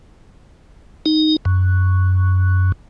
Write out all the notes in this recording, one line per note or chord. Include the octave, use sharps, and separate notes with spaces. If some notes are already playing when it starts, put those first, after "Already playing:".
D#4
F#2